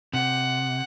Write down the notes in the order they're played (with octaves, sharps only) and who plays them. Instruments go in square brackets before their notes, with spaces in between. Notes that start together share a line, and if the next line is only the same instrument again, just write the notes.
[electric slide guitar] C3 [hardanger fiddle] F#5